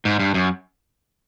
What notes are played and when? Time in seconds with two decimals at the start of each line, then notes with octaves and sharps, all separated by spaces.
0.05 G#2
0.20 G2
0.34 F#2